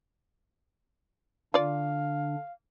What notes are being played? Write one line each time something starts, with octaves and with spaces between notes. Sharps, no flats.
D3 D4 F4 D5 F5